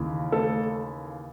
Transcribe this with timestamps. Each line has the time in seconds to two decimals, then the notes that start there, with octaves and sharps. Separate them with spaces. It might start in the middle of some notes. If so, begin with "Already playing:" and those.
Already playing: D#2 C#3 E3
0.32 A3 A4